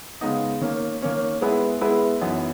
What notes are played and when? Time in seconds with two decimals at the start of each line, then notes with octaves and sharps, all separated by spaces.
0.21 C#3 G#3 B3 D#4
0.61 D#3 A#3 C#4
1.02 D#3 A#3 C#4
1.41 G#3 B3 E4 G#4 B4
1.81 G#3 B3 E4 G#4 B4
2.21 F#2 E3 B3 D#4